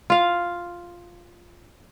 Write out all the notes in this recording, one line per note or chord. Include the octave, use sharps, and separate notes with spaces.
F4 F5